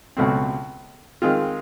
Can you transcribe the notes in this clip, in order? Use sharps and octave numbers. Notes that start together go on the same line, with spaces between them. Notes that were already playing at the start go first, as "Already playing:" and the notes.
C#2 B2 F#3 A3 C4
D#3 G#3 C4 F4